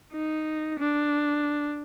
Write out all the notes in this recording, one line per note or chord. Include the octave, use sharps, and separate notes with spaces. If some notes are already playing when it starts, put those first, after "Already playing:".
D#4
D4